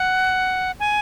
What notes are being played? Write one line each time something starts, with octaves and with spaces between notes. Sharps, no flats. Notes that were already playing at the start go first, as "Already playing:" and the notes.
Already playing: F#5
G#5